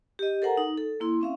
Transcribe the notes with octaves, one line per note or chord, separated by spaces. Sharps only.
G4 D#5
A4 A#4 C5 F#5 G#5 A#5
D#4
A4
A#3 E4 C6
C4 C#4 E5 F5